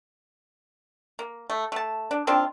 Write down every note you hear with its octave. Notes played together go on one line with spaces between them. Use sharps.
A#3
A3
A3 A5
D4
D#3 C4 D4 F4